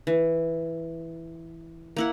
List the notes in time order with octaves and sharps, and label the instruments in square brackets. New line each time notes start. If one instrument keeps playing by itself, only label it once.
[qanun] E3
A#3 E4 F#5